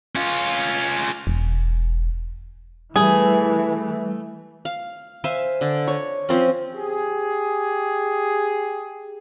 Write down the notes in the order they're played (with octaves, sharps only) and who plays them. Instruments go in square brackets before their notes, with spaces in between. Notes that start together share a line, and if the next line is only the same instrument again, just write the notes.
[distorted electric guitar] C#4 F4
[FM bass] E1
[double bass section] E3 [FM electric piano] G3 [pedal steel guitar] A3 [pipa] G#4
[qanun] F5
C5 E5 F5 G#5
D3
C#5
F3 C4 C#4
[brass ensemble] G4 G#4